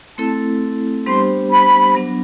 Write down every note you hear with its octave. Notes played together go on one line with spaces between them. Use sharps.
A3 C4 E4 A4 A5
G3 B3 D4 G4 C5 C6
B5
F#3 B3 D4